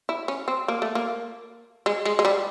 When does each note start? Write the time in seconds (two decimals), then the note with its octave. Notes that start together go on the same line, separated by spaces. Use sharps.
0.09 E4
0.28 C#4
0.48 C4
0.68 A#3
0.82 A3
0.95 A#3
1.86 G#3
2.05 G#3
2.19 G#3
2.25 G3